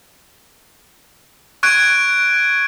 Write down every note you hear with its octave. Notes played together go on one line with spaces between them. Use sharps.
C#6 F#6 G#6 D7